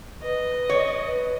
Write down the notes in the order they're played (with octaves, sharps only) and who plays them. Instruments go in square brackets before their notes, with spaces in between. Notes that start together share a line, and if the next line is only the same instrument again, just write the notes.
[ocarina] B4 [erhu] D#5
[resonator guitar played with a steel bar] C#5
[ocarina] B4